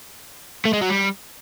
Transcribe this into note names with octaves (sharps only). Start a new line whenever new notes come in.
A3
G#3
F#3
G3